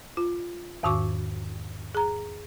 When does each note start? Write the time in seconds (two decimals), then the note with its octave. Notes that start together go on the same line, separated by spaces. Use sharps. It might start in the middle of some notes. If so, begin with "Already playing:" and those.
0.17 F4
0.83 E2 G#2 D#3 F#4 C#6 D6
1.95 G#4 A#5